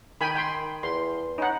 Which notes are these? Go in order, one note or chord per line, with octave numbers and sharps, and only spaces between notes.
D#3 G5 G#5 B5
G5 B5 C6
E2 C6
C#4 D#4 F#5